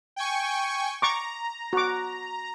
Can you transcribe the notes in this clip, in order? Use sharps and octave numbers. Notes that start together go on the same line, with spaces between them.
G5 G#5 C#6
A#5 C#6 D6
F#4 D6